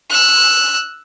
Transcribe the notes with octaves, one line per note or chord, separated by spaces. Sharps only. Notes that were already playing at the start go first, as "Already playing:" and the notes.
E6 F#6